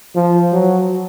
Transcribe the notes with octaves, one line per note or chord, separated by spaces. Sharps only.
F3
F#3